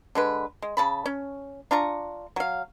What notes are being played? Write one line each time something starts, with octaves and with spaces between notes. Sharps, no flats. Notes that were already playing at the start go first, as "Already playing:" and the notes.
D3 G#3 B4
G#3
C#3 A5 B5
C#4
D4 F4 A#5 C#6
F#3 F5